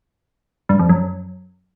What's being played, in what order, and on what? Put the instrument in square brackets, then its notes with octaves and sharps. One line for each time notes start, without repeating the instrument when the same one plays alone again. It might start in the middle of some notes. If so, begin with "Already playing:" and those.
[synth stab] G2
F2
F#2